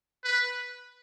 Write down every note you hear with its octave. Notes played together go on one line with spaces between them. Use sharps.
B4